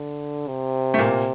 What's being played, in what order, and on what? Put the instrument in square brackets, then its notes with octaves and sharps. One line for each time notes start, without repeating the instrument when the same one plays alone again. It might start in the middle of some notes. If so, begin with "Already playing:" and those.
Already playing: [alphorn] D3
C3
[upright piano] A3
A#2 A#3